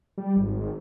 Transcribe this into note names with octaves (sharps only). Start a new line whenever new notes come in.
G3
G#1